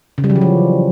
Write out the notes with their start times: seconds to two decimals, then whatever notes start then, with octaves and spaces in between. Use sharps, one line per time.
0.18 C#3
0.24 G3
0.30 F#3
0.36 E3
0.42 F3